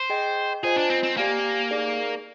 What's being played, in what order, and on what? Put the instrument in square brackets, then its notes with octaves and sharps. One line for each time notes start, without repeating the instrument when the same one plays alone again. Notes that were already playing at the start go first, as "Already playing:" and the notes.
Already playing: [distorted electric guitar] C5
[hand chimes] G#4 D#5 G5
[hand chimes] F4 C5 D#5 G#5 [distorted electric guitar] G#4
[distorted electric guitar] D4
C4
C4
[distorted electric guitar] A#3 [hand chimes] G4 D5 F5 G#5
[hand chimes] D#4 G#4 D5